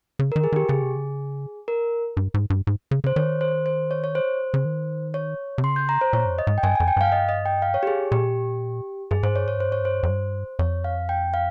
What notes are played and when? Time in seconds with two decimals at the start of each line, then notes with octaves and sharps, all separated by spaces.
0.19 C#3
0.32 D#3 A#4
0.44 G#4
0.52 D#3 G4
0.69 C#3 G#4
0.82 C3
0.96 C#3
1.68 A#4
2.17 G2
2.34 G#2
2.50 G2
2.67 G#2
2.91 C#3
3.04 C#3 C5
3.16 D#3 C#5
3.41 C5
3.66 C5
3.91 C#5
4.04 C#5
4.15 C5
4.54 C#3
4.65 D#3
5.14 C#5
5.58 C3
5.63 C#3 C6
5.76 G6
5.89 A#5
6.01 C5
6.13 A#2 C#5
6.25 G2
6.30 F2
6.38 D#5
6.47 G#2
6.58 G5
6.63 G2 G#5
6.75 F2 G#5
6.88 G5
6.97 G2 F5
7.12 D#5
7.29 D#5
7.46 G5
7.62 F5
7.74 C#5
7.83 G4
7.87 G#4
8.12 A#2 G4
9.11 G2 G#4
9.23 G#2 C5
9.35 G2 C#5
9.46 G#2 C#5
9.58 G2 C5
9.69 G#2 C#5
9.81 G2 C5
10.03 F2
10.09 G2
10.59 F2 C#5
10.84 F5
11.09 G5
11.34 F5